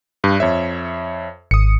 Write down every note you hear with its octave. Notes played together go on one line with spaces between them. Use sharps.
G2
F2 C#5 E5
G#1 D#6 C#7